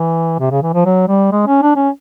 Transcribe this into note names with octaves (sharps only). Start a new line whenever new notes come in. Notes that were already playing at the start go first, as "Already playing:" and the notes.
Already playing: E3
C3
C#3
E3
F3
F#3
G3
G#3
C#4
D4
C#4